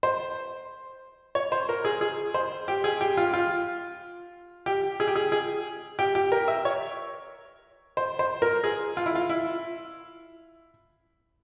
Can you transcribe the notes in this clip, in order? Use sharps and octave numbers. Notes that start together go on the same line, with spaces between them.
C5
C#5
C5
A#4
G#4
G#4
C5
G4
G#4
G4
F4
F4
G4
G#4
G4
G#4
G#4
G4
G4
A#4
E5
C#5
C5
C5
A#4
G#4
F4
E4
F4
E4